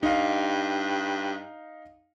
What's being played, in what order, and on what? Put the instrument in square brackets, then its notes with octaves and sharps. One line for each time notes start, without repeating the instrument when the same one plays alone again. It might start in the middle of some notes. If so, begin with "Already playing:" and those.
[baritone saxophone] G2 [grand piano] D#4 F5